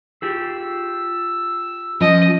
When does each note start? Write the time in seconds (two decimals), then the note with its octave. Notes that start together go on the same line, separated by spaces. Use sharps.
0.22 F4 G4 G#4 E6
2.01 F3 C#4 D#5